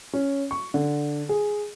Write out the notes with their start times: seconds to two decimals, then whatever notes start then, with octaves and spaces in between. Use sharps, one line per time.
0.13 C#4
0.51 C#6
0.74 D3
1.29 G#4